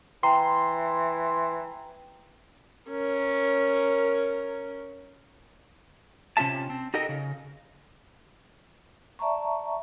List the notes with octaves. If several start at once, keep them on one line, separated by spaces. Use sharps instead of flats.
E3 G5 A#5 C6
C#4 A#4
C3 C#4 F4 G#4 E5 A5
C4
D#4 F#4 G4 A4 A#4 D#5
C#3
D5 E5 A5 A#5 C#6